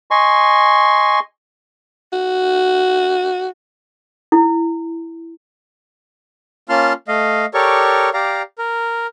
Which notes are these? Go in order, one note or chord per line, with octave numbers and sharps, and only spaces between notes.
D#5 G#5 C6 C#6
F#4
E4
A#3 C#4 F4 A5 C6 F6
A3 D#5 F5
G4 A4 A#4 C#5 D5 C#6
G4 D5 F5 A#5
A#4